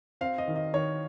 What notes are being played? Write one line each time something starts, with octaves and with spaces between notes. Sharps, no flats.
C4 F5
D#5
D#3
D#5
D#3 C#5